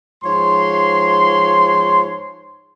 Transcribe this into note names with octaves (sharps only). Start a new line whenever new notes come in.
G#2 F3 C#5 C6